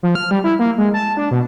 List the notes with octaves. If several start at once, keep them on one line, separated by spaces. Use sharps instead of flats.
F3
F6
G3
E4
A#3
G#3
A5
D4
B2